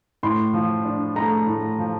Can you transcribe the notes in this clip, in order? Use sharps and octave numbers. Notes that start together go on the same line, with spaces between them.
A2 C6
F3
D4
A3 A#5
A2
F3